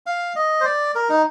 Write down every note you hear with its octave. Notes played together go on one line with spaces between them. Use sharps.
F5
D#5
C5
D5
A#4
D#4